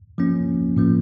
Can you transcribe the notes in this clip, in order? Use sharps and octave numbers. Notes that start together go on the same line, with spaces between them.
F3 A#3 C#4
A2 F3 A#3